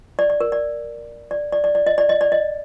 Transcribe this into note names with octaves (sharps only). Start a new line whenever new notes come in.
D5
D5
A#4
D5
D5
D5
D5
D5
D#5
D5
D#5
D5
D#5